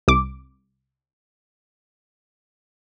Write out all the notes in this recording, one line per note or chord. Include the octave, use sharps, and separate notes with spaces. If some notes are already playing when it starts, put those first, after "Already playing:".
C2 D6